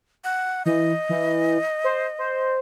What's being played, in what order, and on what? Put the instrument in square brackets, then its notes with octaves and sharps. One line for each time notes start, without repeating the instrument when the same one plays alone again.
[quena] F#5
[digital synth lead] E3 [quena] D#5
[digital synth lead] E3
C5
C5